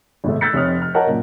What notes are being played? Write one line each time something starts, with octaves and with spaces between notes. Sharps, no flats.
G#1 B2 A3
E6 F#6 G6 A6 B6 C#7
F1 C3 C#5 D#6 F6
F6
A#4 C#5 D#5 F#5 A5
F#2 A#2